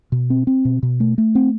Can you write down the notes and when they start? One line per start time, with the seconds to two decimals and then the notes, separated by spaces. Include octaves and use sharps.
0.12 B2
0.30 C4
0.47 C4
0.65 B2
0.83 B2
1.00 A3
1.18 A3
1.35 C4